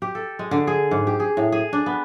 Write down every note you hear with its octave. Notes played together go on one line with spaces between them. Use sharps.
G4
A4
G#3
D3
G#4
G#2
G4
G#4
A2
G#4
D4
B3